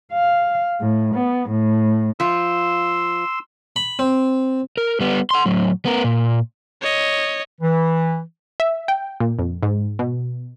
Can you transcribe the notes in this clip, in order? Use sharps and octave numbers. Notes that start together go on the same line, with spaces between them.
F5
A2
B3
A2
F3 F4 C6 E6
B5
C4
A#4
G3 B3
F#5 C6
A2 F#3
B3 A#4
A#2
C#5 D#5
E3
E5
G5
A#2
F2
G#2
B2